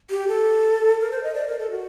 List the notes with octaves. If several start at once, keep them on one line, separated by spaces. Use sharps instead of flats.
G4
A4
A#4
C5
D#5
D5
A#4
A4
F#4